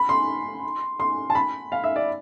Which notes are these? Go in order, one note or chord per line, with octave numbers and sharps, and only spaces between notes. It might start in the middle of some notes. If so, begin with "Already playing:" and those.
Already playing: B5
C6
C6
A5
B5
F5
E5
D5